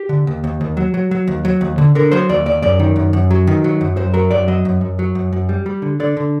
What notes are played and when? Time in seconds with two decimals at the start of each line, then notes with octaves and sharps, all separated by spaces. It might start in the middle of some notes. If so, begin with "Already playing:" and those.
Already playing: G4
0.09 D3
0.27 D#2
0.44 D#2
0.61 D#2
0.77 F#3
0.94 F#3
1.11 F#3
1.27 D#2
1.45 F#3
1.61 D#2
1.78 D3
1.95 D3 A#4
2.12 F#3 C5
2.29 D#2 D5
2.46 D#2 D5
2.62 F#2 D5
2.79 D#3
2.96 F#2
3.13 F#2
3.31 F#3
3.47 D#3
3.64 F#3
3.81 F#2
3.97 F#2 C5
4.14 F#3 A#4
4.31 F#2 D5
4.48 F#3 D#5
4.65 F#2
4.81 F#2
4.99 F#3
5.15 F#2
5.33 F#2
5.49 G3
5.66 G3
5.82 D3
6.00 D3 D5
6.17 D3